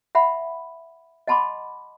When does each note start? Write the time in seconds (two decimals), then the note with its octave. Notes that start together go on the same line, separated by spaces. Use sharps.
0.15 E5 F#5 B5
1.27 D#5 F#5 A5 B5 C6 D6